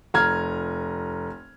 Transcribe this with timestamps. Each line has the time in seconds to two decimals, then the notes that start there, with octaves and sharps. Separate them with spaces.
0.14 F1 A#5 F6 G#6